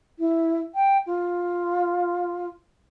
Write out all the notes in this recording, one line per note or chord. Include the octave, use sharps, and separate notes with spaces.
E4
G5
F4